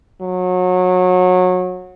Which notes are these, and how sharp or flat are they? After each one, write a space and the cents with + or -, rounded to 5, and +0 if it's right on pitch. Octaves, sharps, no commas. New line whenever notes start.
F#3 -25